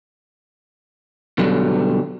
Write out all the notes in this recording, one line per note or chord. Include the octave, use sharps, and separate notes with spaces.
B2 D3 F#3 G3